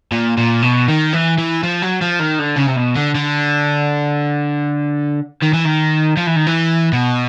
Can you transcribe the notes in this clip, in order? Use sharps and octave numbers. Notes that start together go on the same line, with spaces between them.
A#2
A#2
B2
D#3
E3
E3
F3
F#3
F3
D#3
D3
C#3
C3
B2
D3
D3
D#3
E3
D#3
F3
E3
D#3
E3
B2